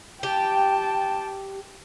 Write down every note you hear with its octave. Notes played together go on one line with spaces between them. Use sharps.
G4 G5 A5